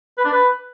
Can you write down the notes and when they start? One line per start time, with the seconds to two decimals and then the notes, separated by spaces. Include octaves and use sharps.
0.18 B4
0.25 D4
0.31 B4